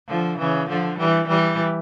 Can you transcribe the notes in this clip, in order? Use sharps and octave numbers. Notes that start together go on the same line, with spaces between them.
D3 F3
C#3 E3
D3 F3
E3 G3
E3 G3